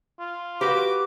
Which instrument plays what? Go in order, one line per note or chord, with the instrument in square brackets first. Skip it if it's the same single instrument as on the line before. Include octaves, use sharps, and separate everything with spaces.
[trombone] F4
[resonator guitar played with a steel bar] F#4 G4 [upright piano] B4 F5 F#5 [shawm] D6